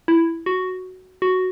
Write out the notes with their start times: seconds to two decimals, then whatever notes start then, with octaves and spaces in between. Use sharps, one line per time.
0.08 E4
0.46 F#4
1.22 F#4